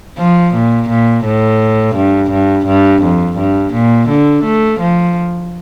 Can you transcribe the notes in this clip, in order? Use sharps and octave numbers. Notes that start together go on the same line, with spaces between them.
F3
A#2
A#2
A2
G2
G2
G2
F2
G2
A#2
D3
A3
F3